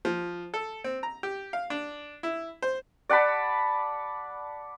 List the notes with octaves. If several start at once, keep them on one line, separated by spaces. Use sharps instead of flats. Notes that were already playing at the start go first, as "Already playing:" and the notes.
F3
A4
C4
A#5
G4
F5
D4
E4
C5
D5 F#5 A5 B5